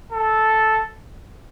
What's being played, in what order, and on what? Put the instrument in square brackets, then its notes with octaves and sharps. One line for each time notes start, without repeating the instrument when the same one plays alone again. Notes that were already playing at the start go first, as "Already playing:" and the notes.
[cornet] A4